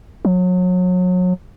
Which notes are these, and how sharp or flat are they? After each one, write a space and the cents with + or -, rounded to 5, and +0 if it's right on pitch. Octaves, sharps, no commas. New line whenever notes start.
F#3 -30